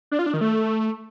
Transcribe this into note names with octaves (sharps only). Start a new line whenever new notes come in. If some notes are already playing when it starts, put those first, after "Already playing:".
D4
F4
D4
D#3
A3